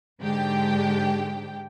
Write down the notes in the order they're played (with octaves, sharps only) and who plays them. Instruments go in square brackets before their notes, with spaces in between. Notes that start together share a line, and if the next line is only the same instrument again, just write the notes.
[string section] G#2 D3 G#3 G4 G5